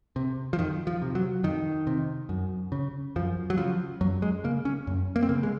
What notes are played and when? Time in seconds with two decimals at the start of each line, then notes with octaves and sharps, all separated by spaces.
0.16 C3
0.53 F3
0.58 F2 D#3
0.87 F3
1.02 C3
1.15 F#3
1.43 F2 D#3
1.87 C3
2.29 F#2
2.72 C#3
3.16 F#2 F3
3.50 F#3
3.58 C#3 F3
4.01 F#2 F#3
4.22 G#3
4.44 C#3 A#3
4.65 C#4
4.87 F#2
5.16 A#3
5.23 C4
5.29 C#3 A#3
5.43 G#3